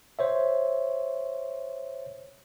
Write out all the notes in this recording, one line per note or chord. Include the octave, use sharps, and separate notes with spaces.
C5 C#5 E5